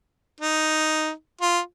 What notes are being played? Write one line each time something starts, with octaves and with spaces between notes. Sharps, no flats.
D#4
F4